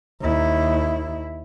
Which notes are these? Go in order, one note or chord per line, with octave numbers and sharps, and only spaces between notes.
D#2 E4